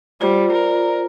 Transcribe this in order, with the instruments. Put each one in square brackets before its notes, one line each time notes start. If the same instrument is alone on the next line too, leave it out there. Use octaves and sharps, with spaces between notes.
[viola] G3 [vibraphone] F4 [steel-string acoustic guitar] C5 F#5 [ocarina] D5
[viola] A#4